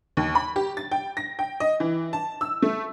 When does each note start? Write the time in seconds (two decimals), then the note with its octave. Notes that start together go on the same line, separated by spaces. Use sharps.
0.17 D#2
0.35 B5
0.56 G4
0.77 A6
0.91 G5
1.17 A#6
1.39 G5
1.60 D#5
1.80 E3
2.13 A5
2.41 E6
2.62 A3